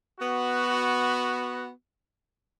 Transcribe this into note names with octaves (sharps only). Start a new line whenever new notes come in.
B3 F#4